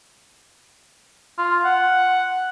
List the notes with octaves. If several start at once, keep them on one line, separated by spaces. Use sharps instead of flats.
F4
F#5